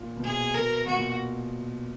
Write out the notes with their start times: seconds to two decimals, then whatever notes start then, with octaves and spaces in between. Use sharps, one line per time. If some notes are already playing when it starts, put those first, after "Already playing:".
Already playing: A#2
0.16 B2
0.23 A#2 G#4
0.55 B2 A#4
0.86 B2 F#4
0.95 A#2